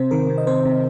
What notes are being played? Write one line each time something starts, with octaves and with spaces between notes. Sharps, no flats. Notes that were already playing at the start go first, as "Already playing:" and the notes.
Already playing: C3 C4 C5
D#3 A#4
C3
D#5
C4 C5
C3